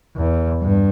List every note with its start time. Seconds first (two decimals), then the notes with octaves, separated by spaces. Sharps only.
0.16 E2
0.61 G2